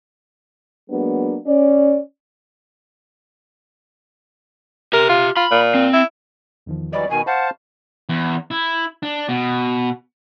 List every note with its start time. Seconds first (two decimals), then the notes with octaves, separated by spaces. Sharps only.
0.90 F#3 G#3 A#3 B3 D4
1.46 C#4 D5
4.93 G4 A#4 E5
5.09 F4
5.36 F4 B5
5.51 A#2
5.75 C4
5.94 E4
6.66 E2 D#3 F3
6.93 E3 F#3 G3 D5 D#5 B5 C#6
7.10 B2 D#3 G#5
7.27 C5 F5 F#5 A5
8.09 E2
8.51 E4
9.03 D4
9.29 B2